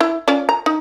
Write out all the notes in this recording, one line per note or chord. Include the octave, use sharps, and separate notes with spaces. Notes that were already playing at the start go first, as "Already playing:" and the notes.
E4
C#4 F4 D5
A#5
D#4